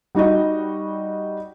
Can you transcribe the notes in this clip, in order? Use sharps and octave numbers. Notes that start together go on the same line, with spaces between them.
G3 D#4 F#4 D#5